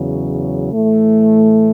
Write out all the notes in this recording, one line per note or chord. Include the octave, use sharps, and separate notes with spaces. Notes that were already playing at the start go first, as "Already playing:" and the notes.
Already playing: E2 C#3 F#3
A2 E3 A3